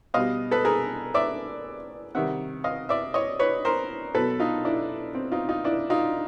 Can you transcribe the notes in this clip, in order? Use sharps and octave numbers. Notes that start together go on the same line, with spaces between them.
B2 G3 D#5 F5
A4 B4
G#4 A#4
D5 E5
C3 D#3 G3 E5 F#5
D#5 F5
D5 E5
C#5 D#5
B4 C#5
A#4 C5
B2 F#3 A4 B4
D#4 F4
D4 E4
C4
D#4 F4
D#4 F4
D4 E4
D#4 F4